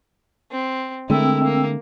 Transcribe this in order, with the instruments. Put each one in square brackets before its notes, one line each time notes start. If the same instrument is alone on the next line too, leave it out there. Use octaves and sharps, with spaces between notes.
[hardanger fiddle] C4
[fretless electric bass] D3 G#3 A3 [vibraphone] C4 G5 E6 [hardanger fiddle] E4 A#4
[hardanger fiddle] A#3